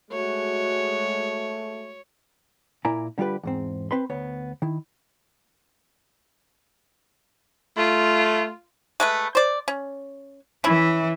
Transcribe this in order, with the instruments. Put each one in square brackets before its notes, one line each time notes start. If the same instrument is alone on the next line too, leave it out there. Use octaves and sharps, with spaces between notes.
[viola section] G#3 F#4 G#4 [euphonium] A3 [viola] C#5
[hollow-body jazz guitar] A#2 E4 A#4 D5 G#5 A#5
D3 G3 F4 G4 B4
E2 G#2 C4
C4 B4 B5 C6
D2 B3 C#5
D#3 E4
[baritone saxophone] A3 [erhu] F4
[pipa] G#3 A3 B4
C5 D5
C#4
[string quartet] E3 [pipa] C#4 E4